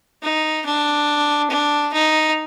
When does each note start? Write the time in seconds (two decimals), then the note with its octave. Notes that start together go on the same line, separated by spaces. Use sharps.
0.23 D#4
0.66 D4
1.50 D4
1.93 D#4